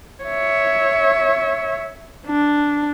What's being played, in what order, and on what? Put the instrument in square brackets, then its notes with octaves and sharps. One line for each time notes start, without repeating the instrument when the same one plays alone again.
[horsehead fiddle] C#5 E5
D4